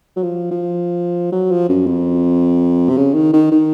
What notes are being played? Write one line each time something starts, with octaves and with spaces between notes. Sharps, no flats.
F#3
F3
F3
F#3
F3
F#2
F2
C3
C#3
D#3
D#3
D#3